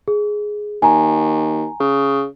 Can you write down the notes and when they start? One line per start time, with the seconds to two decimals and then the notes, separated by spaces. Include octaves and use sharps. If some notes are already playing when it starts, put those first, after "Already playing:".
0.08 G#4
0.82 D#2 G#5 A#5
1.80 C#3